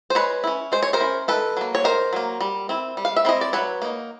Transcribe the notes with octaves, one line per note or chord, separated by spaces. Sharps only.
C5
G#3 B4 C#5
C#4 E4
G#3 C5
C#5
A#4 C5
C#4 E4
D#3 A4 B4
F#3 A#3
C#5
D#3 A#4 C5
F#3 A#3
G3
C4 E4
G3
F5
E5
C4 E4 D#5
D5
F#3 B4 C#5
A#3 D#4